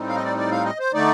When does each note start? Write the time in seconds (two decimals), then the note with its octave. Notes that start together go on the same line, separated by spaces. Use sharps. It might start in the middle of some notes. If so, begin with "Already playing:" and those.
Already playing: A2 G3 C4 D#4
0.09 F5
0.16 D#5
0.23 D5
0.37 D5
0.51 F5
0.65 D#5
0.79 C5
0.93 D3 A3 D#4 D5